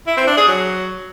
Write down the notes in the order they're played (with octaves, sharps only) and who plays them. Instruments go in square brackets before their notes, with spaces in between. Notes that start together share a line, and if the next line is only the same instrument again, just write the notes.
[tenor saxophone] E4
C4
D4
G#4
F#3